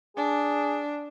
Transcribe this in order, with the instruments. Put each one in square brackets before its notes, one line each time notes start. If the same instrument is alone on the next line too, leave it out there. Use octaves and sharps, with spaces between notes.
[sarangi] D4 [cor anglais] G#4